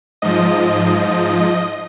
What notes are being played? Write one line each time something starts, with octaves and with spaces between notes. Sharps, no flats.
G#2 F3 D#5